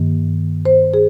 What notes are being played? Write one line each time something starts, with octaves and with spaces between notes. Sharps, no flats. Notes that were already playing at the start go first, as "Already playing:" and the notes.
Already playing: G2 D#3 A#3
C5
G#4